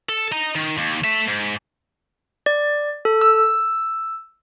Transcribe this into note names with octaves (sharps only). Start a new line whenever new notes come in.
A4
D#5 A#5
D#3
D#2
A3 E5
G#2
D5
A4
E6